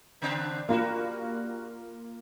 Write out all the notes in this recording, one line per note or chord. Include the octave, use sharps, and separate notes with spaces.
C#3 C4 D4
G3 A#3 F4 F#4 A#5